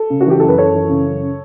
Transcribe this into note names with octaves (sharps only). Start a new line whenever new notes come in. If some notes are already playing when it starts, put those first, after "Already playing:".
Already playing: A4
C#3
F#4
E3 G4
F#2 A4
B4
F#2 A4 C#5
E3
C#3
F#2